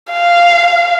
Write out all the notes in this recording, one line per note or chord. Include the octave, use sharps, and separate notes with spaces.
F5